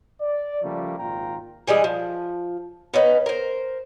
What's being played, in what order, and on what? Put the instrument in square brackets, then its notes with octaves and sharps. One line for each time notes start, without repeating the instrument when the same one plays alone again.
[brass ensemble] D5
C#3 F3 G3 A3 A#3
G#1 A#2 F4 G5 A#5
[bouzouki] E3 G3 G#3 G#4
F3
B3 C#4 D#4 B4
A#4 C5